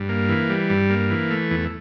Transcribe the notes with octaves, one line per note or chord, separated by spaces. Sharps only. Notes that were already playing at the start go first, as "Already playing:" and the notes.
Already playing: G2
A#3
E3
G3
G2
A#3
E3
A3
E2